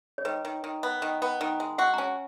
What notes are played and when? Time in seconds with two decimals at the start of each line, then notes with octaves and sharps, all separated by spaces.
0.18 C#5
0.25 D#3 B4
0.45 D#3
0.64 D#3
0.83 B3
1.02 D#3
1.22 B3
1.41 D#3
1.60 G#3
1.78 F#4 F#5
1.94 A#5
1.98 C#4 G#5